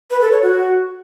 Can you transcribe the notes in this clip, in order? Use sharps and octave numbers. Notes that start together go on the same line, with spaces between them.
B4
A4
C#5
F#4